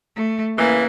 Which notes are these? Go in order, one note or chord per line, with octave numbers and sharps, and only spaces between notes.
A3
C#3 E3 A#3